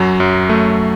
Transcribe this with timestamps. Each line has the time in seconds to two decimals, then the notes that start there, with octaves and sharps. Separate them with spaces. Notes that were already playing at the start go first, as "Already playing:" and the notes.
Already playing: F#2 F#3
0.20 F#2
0.49 A3